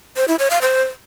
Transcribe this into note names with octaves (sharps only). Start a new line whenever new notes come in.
C5
E4
C#5
F5
C5